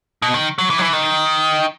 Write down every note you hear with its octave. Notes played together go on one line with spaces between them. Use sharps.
B2
D#3
F#3
E3
F#3
E3
D#3